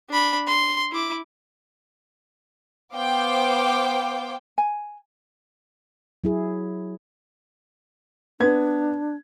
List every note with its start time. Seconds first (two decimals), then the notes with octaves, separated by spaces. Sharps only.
0.10 D4 B5
0.47 C6
0.92 E4 D6
2.95 B3 C5 F5 G5 D6
4.58 G#5
6.24 F#3 E4 G#4
8.40 B3 D4 G#6